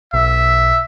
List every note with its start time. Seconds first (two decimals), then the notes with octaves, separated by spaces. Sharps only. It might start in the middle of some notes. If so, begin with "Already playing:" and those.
0.14 B1 E5